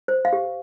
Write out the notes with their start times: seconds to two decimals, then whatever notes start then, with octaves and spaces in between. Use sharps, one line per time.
0.08 C5
0.25 F5
0.33 G4